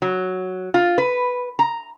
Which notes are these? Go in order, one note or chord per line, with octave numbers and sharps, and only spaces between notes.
F#3
F4
B4
A#5